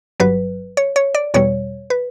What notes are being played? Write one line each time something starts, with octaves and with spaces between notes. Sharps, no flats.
G1 G2 F#3 B4
C#5
C#5
D5
E2 B2 G3 C#5
B4